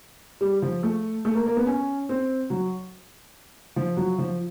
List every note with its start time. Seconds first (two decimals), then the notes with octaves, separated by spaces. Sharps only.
0.41 G3
0.62 F3
0.83 A3
1.25 A3
1.35 A#3
1.46 A#3
1.57 B3
1.67 C#4
2.09 C4
2.50 F#3
3.76 F3
3.97 F#3
4.18 F3